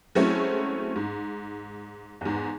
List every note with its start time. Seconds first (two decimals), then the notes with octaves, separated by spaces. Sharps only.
0.15 F#3 G#3 A3 C4 C#4 E4
0.96 G#2
2.21 E2 G#2